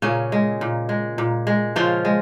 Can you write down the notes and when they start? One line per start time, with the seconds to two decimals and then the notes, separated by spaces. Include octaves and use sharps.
0.02 A#2 C#3 C#4
0.32 G#3
0.61 A#2
0.89 G#3
1.18 A#2
1.47 G#3
1.76 C#3 F3 F4
2.05 G#3